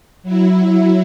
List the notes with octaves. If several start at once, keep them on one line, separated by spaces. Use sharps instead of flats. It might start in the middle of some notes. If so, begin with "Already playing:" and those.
F#3 E4